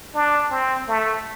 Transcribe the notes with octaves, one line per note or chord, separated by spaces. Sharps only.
D4
C4
A3